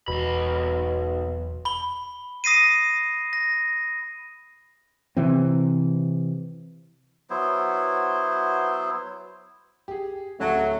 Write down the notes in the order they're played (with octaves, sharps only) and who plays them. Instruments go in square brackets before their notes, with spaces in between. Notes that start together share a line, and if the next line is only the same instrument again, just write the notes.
[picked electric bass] E1 [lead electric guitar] B1 B5 [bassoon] B2
[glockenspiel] B5 G7
D#6 A#6 C7 D#7
A#6
[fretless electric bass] C3 E3 C4
[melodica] F#3 B3 E4 C5
[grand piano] G4 G#4
[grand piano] D1 C#4 A5 [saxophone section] F#3 [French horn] A3